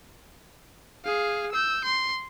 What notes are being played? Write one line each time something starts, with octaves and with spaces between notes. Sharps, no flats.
G#4 F5
E6 G6
C6